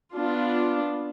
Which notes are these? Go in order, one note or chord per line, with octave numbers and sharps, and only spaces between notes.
B3 D4 F4